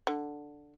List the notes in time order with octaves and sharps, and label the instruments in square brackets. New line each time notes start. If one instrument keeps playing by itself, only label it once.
[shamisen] D3